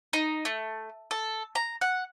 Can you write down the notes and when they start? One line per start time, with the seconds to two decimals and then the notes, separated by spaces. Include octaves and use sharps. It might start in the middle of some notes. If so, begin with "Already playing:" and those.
0.13 D#4
0.45 A3
1.11 A4
1.55 A#5
1.81 F#5